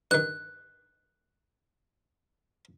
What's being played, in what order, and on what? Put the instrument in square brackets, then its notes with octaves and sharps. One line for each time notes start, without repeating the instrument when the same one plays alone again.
[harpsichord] G2 D#3 [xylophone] F#6